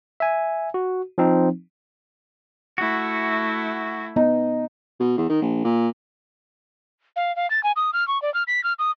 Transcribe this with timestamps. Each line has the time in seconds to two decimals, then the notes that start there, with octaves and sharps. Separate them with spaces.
0.20 E5 G#5
0.74 F#4
1.18 F3 C4 D#4
2.78 A3 E4 F#4
4.16 B3 D#4
5.00 B2
5.18 E2
5.30 D#3
5.42 A#1
5.64 A#2
7.16 F5
7.36 F5
7.50 A6
7.64 G#5
7.76 D#6
7.93 F6
8.08 C#6
8.22 D5
8.34 F6
8.47 B6
8.64 F6
8.79 D#6